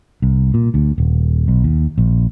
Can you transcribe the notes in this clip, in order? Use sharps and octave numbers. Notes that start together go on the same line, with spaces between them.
C2
A#2
D2
D#1
B1
D#2
A#1